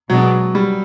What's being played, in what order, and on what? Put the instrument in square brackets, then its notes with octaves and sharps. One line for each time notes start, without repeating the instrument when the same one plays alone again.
[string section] B2 G#3 B3 D4 [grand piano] F#3
[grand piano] G3